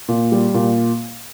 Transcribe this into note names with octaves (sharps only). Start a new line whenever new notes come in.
A#2
G3
A#2